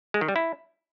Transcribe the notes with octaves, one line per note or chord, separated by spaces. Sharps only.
G#3
D#3
G3
E4